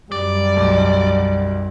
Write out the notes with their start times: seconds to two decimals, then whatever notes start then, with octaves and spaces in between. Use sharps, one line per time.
0.12 F#2 G3 D5
0.56 B1